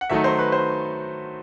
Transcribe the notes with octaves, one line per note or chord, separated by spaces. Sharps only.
F#5
D#3 F#3 A3 D#4 E5
C5
B4
C5